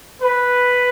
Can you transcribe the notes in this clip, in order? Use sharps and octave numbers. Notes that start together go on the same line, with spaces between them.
B4